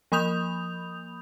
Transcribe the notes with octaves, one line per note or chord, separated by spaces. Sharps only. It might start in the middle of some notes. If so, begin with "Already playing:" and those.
F3 A#3 B5 D#6 G6 F7